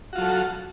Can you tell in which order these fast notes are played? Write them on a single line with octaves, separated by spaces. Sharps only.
F#4 F4 F#3 A4